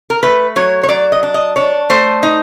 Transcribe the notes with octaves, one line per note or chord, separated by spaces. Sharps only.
A#4
A3 B4
F#3 C#5
C#5
F#3 D5
D#5
D4
D#5
D4 C#5
A3 C5
D#4